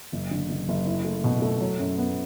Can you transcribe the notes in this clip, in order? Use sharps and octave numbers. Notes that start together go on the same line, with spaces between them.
F#1
D3
F#1
F#1
E4
A3
B2
A3
F#3
F#2
B3